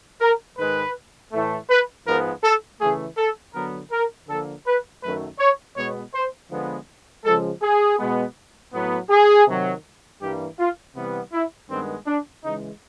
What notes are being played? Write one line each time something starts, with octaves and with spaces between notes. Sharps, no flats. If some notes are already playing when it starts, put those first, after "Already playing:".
A#4
G#2 D#3 G#3 B4
A2 E3 A3
B4
G#2 F3 G#3 B3 A#4
A4
C#3 E3 A3 G#4
A4
D3 F#3 B3 A#4
A#4
D3 F3 A#3 A4
B4
F#2 D#3 F#3 A3 B4
C#5
B2 G#3 B3 C#5
C5
D3 F3 G#3 B3
C#3 F3 G#3 A4
G#4
B2 G#3 B3
A2 F#3 B3
G#4
C3 D#3 F#3
G2 E3 G3 A#3 G4
F4
C3 E3 G3 B3
E4
G2 D#3 G#3 B3 C4
D4
C#3 E3 G#3 D#4